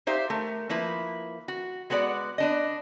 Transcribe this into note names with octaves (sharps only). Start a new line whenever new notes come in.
D#4 G4 C5 E5 F5
A3 A#4
F3 A#3 E4 B4
F#4
G#3 B3 F#4 A#4 D5 F#5
B3 D4 D#5